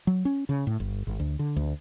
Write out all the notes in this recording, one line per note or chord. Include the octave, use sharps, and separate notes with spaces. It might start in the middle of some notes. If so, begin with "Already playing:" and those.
F#3
C#4
C#3
A2
G1
G#1
D2
D3
D2